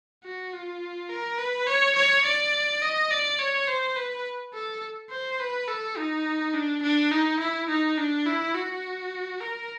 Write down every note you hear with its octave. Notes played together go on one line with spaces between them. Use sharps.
F#4
F4
A#4
B4
C#5
C#5
D5
D#5
D5
C#5
C5
B4
A4
C5
B4
A4
D#4
D4
D4
D#4
E4
D#4
D4
E4
F#4
A#4